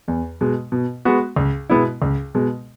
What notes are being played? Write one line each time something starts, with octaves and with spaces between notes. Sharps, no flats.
E2
B2 G#3
B2
G#3 B3 F#4
C#2
B2 G#3 B3 E4
C#2
B2 G#3